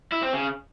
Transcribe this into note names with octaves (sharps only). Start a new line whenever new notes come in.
E4
C4
C#3